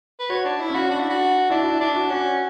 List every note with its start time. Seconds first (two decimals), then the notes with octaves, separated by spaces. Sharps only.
0.19 B4
0.30 F#4 C#5
0.45 D4
0.60 E4
0.70 C#4
0.75 F#4
0.90 D4 F#4
1.00 E4
1.10 F#4
1.50 D4 E4
1.61 F#4
1.65 E4
1.80 D4 E4
1.95 F#4
2.10 C#4 F#4